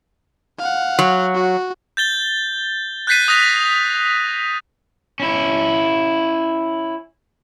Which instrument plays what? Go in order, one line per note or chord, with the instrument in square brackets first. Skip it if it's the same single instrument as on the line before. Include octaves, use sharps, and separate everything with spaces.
[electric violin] F5 F#5
[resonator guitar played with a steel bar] F#3
[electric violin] F#4
[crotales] G6 A6 G7
F#6 G6 A6 B6 C7 D#7
D#6 F#6 A#6 F7
[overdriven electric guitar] C#4 E4